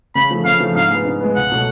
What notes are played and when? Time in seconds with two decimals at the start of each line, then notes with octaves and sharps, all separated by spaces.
0.15 C#3 B5
0.31 F3 A3
0.45 C#3 F5
0.60 F3 A3
0.75 G#2 F5
0.90 G#3 B3
1.05 G#2
1.20 G#3 B3
1.35 C#2 F#5
1.51 B2 F#3 A3